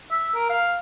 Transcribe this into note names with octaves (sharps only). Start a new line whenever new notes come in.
E5
A#4
F5